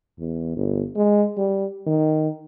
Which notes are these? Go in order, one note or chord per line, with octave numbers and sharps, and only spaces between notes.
E2
G1
G#3
G3
D#3